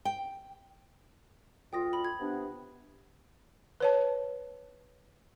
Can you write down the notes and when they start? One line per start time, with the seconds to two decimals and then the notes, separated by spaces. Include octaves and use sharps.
0.05 G5
1.73 D2 F4 G5 D#6 A#6
1.93 B5 F#7
2.05 G#6
2.20 C3 B3 D4
3.80 B4 C#5 A5